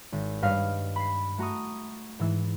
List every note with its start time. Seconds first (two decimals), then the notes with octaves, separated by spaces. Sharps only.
0.12 G#1
0.42 G2 B4 C#5 D#5 F5
0.96 B5 C7
1.38 A3 F#4 A#5 C#6 D#6
2.19 G#2 E3 E6